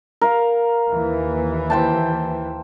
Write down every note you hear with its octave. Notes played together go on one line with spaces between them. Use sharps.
A#4 F5
D#2 E3
C5 G5 A5